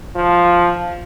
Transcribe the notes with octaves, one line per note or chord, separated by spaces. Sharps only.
F3